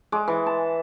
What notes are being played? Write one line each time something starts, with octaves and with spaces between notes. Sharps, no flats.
G#3 D6
E3
A5